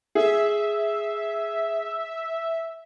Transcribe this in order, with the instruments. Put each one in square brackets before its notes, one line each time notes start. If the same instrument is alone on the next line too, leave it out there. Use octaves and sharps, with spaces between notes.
[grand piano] G#4 [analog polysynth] E5